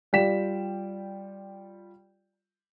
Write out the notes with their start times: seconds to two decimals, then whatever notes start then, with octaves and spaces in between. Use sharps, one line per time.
0.13 G3 F4 D5 G5 B6 E7